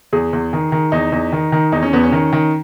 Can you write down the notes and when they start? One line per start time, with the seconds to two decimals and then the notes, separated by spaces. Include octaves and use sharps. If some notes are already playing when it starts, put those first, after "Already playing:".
0.13 E2 G#4
0.33 E2
0.53 D#3
0.72 D#3
0.92 E2 D#4
1.12 E2
1.32 D#3
1.52 D#3
1.72 E2 D#4
1.83 C#4
1.93 E2 B3
2.04 C#4
2.12 D#3
2.33 D#3